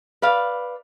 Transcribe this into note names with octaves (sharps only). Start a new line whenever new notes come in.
B4 D5 F5